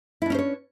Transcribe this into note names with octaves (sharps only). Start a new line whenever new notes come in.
C#4 D4 E4 C5 C#5